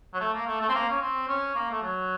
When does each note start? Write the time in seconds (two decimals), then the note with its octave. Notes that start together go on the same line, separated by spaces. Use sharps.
0.13 F#3
0.20 A3
0.34 A#3
0.47 A3
0.61 A3
0.68 C4
0.75 A#3
0.90 C#4
1.01 C4
1.28 C#4
1.55 A#3
1.71 A3
1.82 F#3